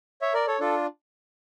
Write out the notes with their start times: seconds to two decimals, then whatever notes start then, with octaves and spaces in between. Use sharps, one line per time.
0.22 C#5 E5
0.34 A#4 D5
0.47 A4 C#5
0.60 D4 F4 A4